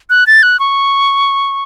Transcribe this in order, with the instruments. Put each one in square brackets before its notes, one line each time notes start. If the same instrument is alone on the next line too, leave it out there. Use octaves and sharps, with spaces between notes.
[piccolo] F#6
A6
F#6
C#6